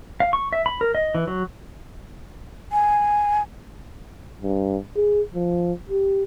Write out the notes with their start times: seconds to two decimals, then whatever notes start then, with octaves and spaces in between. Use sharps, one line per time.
0.20 F5
0.33 C#6
0.53 E5
0.66 B5
0.81 A#4
0.95 D#5
1.15 E3
1.28 F#3
2.72 G#5
4.43 G2
4.96 G#4
5.34 F3
5.89 G4